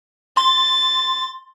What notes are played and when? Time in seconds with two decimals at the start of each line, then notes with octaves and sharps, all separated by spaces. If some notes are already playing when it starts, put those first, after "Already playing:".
0.37 C6 A6